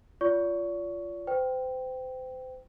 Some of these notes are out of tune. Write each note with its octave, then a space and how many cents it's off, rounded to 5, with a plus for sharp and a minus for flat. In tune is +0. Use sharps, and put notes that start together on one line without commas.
F4 -10 D5 -40 C#6 +10
C5 -35 G5 -5